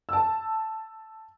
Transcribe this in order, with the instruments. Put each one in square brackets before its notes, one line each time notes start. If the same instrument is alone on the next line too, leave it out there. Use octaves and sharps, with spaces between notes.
[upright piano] A5 E6